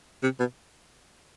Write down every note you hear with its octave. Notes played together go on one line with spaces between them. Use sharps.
C3
B2